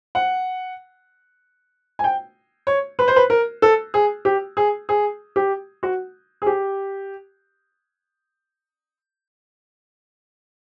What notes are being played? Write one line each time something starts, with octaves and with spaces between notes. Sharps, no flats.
F#5
G#5
G5
C#5
B4
C5
B4
A#4
A4
G#4
G4
G#4
G#4
G4
F#4
G#4
G4